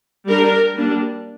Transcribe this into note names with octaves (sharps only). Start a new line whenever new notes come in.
G3 D4 A#4
G3 A#3 D4